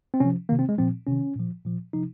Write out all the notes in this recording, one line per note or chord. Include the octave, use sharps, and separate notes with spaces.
C4
C3 F3 C#4
C3 D#3 A#3
C4
G#3
A#2 F3 C4
C3 D#3 C#4
A#2 F3
A#2 F3
C3 F3 D#4